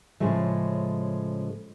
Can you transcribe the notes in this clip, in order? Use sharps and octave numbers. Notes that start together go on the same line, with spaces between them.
A2 C#3 F3 G#3 A3